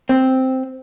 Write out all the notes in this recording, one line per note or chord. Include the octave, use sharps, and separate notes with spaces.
C4